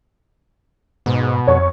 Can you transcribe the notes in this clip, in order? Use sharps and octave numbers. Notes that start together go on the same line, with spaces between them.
G#2 B2
F2 C#5